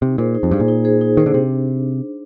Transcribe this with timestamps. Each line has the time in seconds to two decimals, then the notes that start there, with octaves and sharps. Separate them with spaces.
0.02 C3 D#4
0.18 A#2 G#4 C5
0.35 D#4
0.43 F2
0.51 G2 G#4 C5
0.60 A#2
0.68 D#4
0.85 G#4 C5
1.01 D#4
1.17 D#3 G#4 C5
1.26 D3
1.34 C3 D4